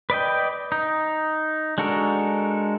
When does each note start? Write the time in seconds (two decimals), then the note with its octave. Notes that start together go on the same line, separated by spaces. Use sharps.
0.10 B4 D5 D#5 G5
0.72 D#4
1.78 G#3 D4 F#4 A4 A#4